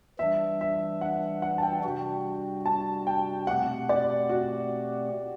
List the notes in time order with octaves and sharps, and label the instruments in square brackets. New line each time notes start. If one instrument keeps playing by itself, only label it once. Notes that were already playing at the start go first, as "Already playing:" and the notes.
[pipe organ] E3 G3 D4 [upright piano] E5
[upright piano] E5
F#5
F#5
A5
G5
[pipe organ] C3 G3 D4 F#4
[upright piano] A5
G5
[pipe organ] B2 A3 C4 G4 [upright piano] F#5
[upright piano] D5
F#4